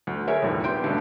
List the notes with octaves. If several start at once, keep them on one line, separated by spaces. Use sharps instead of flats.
D2
G#4 A#4 C#5 E5
F1 A#1 D#2
B3 G4 C6 G6 D7
G2 B2 D3 G3 A3 C#4